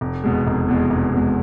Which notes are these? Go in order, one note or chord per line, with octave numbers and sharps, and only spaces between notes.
F1
E2 B2 G#3
F1
E2 B2 G#3
F1
E2 B2 G#3